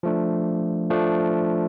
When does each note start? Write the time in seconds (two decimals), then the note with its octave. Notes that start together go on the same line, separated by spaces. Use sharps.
0.03 F3 A3 D4
0.90 F3 A3 D4